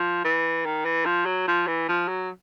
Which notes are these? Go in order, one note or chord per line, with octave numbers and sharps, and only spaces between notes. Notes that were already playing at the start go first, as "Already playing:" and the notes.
Already playing: F3
E3
D#3
E3
F3
F#3
F3
E3
F3
F#3